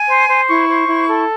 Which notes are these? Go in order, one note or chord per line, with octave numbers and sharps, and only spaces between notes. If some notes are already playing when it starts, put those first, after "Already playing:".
Already playing: G#5
C5
C5
E4 C#6
C5
E4
A4